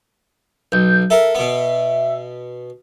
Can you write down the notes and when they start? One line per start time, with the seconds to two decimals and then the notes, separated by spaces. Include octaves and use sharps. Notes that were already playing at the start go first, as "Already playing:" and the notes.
0.72 B1 G6
1.10 A4 A#4 E5
1.35 B2 B3